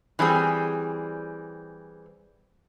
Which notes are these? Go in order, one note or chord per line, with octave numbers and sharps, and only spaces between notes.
E3 G3 C4 G#4